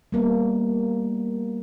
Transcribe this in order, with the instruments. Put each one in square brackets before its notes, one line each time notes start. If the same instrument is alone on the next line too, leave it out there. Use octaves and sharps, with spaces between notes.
[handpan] G3 A#3 B3